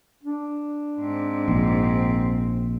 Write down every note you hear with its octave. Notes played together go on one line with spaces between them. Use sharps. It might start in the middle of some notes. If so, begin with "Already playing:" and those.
D4
G#2 C4
A#1